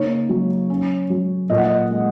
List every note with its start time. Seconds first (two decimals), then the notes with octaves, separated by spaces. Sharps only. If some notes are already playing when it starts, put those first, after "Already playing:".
Already playing: C#3 A#3 D#4 C#5
0.29 F#3
0.70 C#4
1.10 F#3
1.50 A#2 D#5
1.58 F#5
1.65 D#5
1.90 G#3